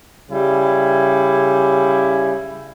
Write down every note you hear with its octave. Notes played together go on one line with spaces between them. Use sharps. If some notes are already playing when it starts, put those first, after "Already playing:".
C#3 G3 E4